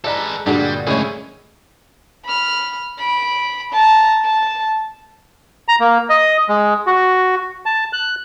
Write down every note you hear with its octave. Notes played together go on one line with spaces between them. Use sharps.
G#3 A4 B4 D5 A#5
G2 A#2 D3 G3 D4 F#4 G#4
A2 C#3 F3 G#3 E4 G#4 C#5
B5 F6
B5 D7
A5 A#5
A5
A#5
A#3
D#5
G#3
F#4
A5
F#6